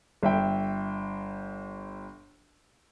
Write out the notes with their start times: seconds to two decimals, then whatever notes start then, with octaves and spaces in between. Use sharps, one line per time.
0.23 G1 E5 G5